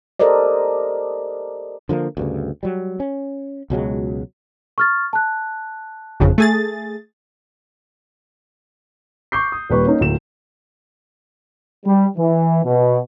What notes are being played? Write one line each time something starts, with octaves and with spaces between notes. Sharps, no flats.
G4 A4 A#4 C5 D5 D#5
D3 F3 G#3 A#3
D2 G2 C#3
F#3 G3
C#4
C#2 B2 F#3 G#3
C#6 F6 A6
A5 F#6
G1 F2 C#3
A3 G#4 A6
C#6 D6 G6 C7
D#6
D#1 G3 B4 C#6
A#3 C#4 D#4
D1 E7
G3
E3
B2